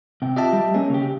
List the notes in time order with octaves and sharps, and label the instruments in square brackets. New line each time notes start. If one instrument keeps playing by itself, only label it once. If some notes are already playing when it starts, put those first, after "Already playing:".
[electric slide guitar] C3 G5
[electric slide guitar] F4 G4 [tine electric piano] D#5 E5 A5
[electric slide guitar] G3
[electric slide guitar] A#3 G#4 [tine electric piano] C#4
[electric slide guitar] C#3 G4